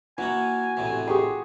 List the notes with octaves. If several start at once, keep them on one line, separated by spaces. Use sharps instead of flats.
E3 A#3 F#4 F#5 G#5
A1 C3 E3
G4 G#4 C6 C#6